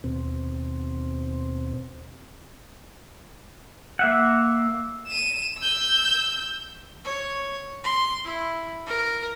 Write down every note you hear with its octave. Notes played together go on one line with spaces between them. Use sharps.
D#2 B2 C4
A#3 E5 F#5
D#7 E7
E6 G6
C#5
C6
E4
A#4